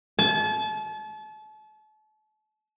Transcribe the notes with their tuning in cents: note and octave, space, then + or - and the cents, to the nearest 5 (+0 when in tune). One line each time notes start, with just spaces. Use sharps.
A5 -35